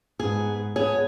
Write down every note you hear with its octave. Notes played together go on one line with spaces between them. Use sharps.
G#2 B3 G#4
B3 G#4 C#5